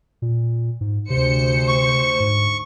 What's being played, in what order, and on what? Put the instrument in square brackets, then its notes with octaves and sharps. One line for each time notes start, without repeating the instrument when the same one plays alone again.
[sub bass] A#2
G#2
[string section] D2 C5 C#7 [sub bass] C3
[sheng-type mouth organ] C#6
[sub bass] G#2